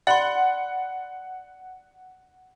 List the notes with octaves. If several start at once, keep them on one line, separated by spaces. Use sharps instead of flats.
D5 F#5 B5 C6